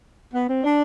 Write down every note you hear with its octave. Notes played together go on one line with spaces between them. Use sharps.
B3
C4
D4